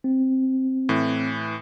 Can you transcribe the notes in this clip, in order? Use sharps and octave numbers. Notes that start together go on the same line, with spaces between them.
C4
A2 E3